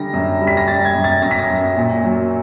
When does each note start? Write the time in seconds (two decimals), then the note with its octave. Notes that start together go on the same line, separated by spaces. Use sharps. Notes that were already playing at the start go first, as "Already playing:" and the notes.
Already playing: D3 G3 A#6
0.14 F#2
0.41 G3
0.47 B6
0.57 A#6
0.68 G3 A6
0.85 G#6
0.95 F#2
1.04 A6
1.22 F#2 A#6
1.31 B6
1.39 A#6
1.50 F#2
1.77 A#2
2.04 F#3